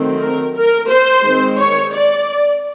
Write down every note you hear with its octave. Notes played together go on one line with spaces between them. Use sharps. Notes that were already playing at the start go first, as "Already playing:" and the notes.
Already playing: D#3 F#3 A3 C4
A#4
A#4
C5
D#3 G#3 C4
C#5
D5